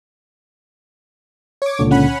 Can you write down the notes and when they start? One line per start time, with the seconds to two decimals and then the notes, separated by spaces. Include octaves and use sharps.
1.62 C#5 D6
1.79 C#2 A#2 D3
1.91 C#4 F#5 B5